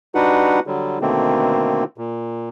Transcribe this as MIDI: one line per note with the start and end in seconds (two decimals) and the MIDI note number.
0.15 0.60 55
0.15 0.60 62
0.15 0.60 63
0.15 0.60 66
0.15 0.60 71
0.15 0.60 78
0.67 0.99 50
0.67 0.99 54
0.67 0.99 55
1.01 1.84 47
1.01 1.84 50
1.01 1.84 51
1.01 1.84 57
1.01 1.84 58
1.01 1.84 60
1.98 2.49 46